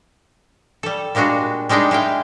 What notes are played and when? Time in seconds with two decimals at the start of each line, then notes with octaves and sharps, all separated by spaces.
0.83 G3 A4
1.15 A#2 G3 G#3 D4 F#4
1.69 G3 G#3 D4 D#4 G5
1.91 G#3 E4 F5 G5